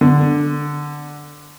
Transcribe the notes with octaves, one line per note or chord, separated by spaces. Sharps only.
D3